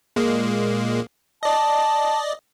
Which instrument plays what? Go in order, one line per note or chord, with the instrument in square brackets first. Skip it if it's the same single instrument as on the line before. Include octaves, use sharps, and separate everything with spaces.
[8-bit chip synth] A#2 G#3 A#3
[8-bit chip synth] D5 D#5 [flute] A5